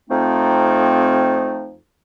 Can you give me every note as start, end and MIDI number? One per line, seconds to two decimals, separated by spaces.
0.10 1.75 41
0.10 1.75 53
0.10 1.75 57
0.10 1.75 60
0.10 1.75 63